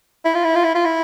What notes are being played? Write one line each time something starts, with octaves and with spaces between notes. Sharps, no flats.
E4
F4
E4
F4
E4
F4
E4